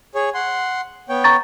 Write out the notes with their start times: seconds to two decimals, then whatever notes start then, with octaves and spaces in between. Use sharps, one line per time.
0.15 G#4 C#5
0.34 F#5 C6
1.09 B3 C#5 G5
1.24 A#5 C#6 A6